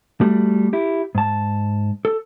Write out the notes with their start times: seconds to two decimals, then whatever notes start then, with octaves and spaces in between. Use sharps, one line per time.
0.21 G3 A3 F#4
0.73 E4 G4
1.15 G#2 A5
2.05 A4